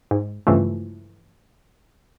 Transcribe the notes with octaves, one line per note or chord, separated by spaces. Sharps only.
G#2
C#2 G2 E3 F3 A3